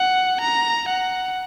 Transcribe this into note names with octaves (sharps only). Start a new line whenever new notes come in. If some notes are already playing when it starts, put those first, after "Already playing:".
Already playing: F#5
A#5
F#5